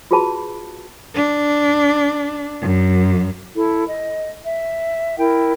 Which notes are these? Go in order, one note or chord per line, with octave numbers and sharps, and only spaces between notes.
F4 F#4 G#4 B4 A5 B5
D4
F#2
E4 A4
D#5
E5
E4 A#4 G5